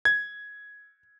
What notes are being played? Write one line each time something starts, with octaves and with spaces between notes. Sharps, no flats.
G#6